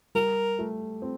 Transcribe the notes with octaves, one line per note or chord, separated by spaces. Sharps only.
G3 A#4
A3
C4